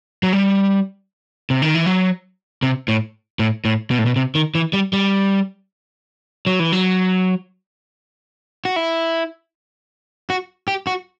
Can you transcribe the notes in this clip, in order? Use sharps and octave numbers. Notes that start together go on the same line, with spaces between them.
F#3
G3
C3
D#3
E3
F#3
C3
A2
A2
A2
B2
A2
B2
C3
D#3
E3
G3
G3
F#3
E3
F#3
F#4
E4
F#4
G4
F#4